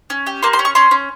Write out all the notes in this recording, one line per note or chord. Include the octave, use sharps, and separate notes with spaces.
C#4
G4
A#3 C6
C6
C#4
C#6
C#4 C6
C#4